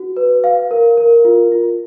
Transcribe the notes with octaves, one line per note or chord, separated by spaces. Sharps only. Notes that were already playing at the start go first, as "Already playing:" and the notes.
Already playing: F#4
B4
F5
A#4
A#4
F4
F4